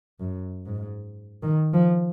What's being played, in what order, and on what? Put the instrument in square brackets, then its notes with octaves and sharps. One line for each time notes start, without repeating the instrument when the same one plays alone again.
[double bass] F#2
G#2
D#3
F3